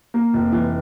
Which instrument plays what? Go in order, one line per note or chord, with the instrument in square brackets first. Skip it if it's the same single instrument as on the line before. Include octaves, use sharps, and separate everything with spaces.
[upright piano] A#3
F1
E3